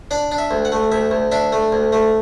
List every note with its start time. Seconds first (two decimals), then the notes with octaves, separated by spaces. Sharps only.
0.11 D4 D5
0.32 D4
0.38 E5
0.51 D2
0.65 F#5
0.72 A3
0.92 D2 E5
1.11 D2
1.32 D4 E5
1.52 A3
1.72 D2
1.92 A3